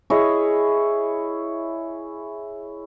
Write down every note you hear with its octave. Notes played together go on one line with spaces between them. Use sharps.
E4 G#4 C#5 D#5